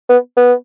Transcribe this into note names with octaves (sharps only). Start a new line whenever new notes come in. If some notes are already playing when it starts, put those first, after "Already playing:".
B3
B3